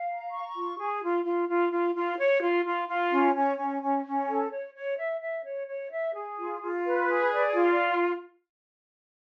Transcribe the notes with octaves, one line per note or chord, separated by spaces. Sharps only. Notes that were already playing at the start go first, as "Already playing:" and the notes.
Already playing: F5
A#5
C#6
F4
G#4
F4
F4
F4
F4
F4
C#5
F4
F4
F4
C#4
C#4
C#4
C#4
C#4
A4
C#5
C#5
E5
E5
C#5
C#5
E5
G#4
F4
F4
B4
G#4
D5
F4